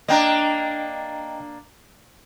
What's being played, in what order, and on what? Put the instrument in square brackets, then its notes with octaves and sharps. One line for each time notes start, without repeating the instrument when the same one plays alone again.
[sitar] A#3 D4 [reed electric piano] D#5 G5 A#5